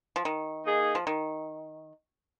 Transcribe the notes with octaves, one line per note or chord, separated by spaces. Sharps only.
F3
D#3
A#3 D#4 G#4
F3
D#3